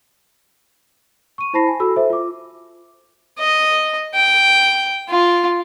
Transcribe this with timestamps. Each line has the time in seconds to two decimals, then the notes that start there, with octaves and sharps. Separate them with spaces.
1.38 C#6 D#7
1.53 E4 C5 A5 B5 A#6 C7
1.67 G#5
1.80 F#4 A4 B5 E6
1.96 A4 C5 E5
2.10 F4 D6
3.39 D#5
4.15 G5
5.09 F4